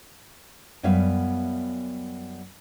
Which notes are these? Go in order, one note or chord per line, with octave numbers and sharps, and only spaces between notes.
F#2 G3 B3 C#5 E5 F5